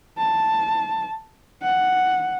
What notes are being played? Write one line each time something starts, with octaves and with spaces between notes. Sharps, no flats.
A5
F#5